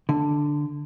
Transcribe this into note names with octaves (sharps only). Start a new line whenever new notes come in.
D3